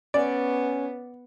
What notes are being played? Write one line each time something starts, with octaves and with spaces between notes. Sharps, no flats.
B3 C#4 D5